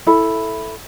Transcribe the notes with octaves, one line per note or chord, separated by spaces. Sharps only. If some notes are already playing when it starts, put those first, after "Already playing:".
E4 A4 B5